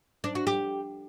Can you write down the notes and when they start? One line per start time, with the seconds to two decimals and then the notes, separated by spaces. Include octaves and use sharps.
0.24 D4
0.35 F#4
0.47 G4